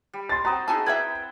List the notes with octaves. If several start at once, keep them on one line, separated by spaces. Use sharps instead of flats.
G3
C6 A6
C4 F#4 A#5 D#6
D#4 E4 F#4 G#4 G#5 A5
E4 B4 D5 E5 F#5 G5 G#6